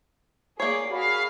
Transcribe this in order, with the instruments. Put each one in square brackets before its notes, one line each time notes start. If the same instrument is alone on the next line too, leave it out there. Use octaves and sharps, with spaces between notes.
[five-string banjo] A#3 C#5 [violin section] G#4 D5 [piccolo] C7
[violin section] F#4 G#4 [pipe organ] F5 [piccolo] B5